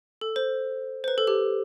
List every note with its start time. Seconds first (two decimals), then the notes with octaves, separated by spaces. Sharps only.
0.21 A4
0.36 C5
1.04 C5
1.08 B4
1.18 A4
1.27 G4